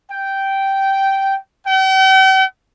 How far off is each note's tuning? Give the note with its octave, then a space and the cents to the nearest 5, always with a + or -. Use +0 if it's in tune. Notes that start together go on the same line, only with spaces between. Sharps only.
G5 -10
G5 -45